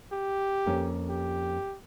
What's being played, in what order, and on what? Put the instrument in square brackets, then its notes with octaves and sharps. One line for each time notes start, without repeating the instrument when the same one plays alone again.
[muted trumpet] G4
[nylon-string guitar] F2 A#3 C#4
[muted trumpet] G4